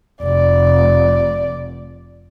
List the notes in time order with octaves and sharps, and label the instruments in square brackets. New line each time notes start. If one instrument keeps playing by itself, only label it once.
[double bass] F1 [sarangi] D5